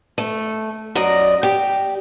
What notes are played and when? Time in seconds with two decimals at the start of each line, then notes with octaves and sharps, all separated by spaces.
0.18 A3
0.95 F#2 D5 D#5 A#5
1.43 G4